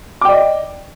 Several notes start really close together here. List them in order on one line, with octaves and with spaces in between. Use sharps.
D6 G5 D5 D#5